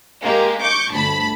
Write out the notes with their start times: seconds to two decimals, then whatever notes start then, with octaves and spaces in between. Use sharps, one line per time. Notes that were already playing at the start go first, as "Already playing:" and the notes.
0.22 G#3 A#3 G4
0.63 C#6 D6 G6
0.92 G1 D2 A5 B5